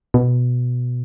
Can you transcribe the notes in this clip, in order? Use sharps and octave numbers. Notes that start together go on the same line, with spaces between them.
B2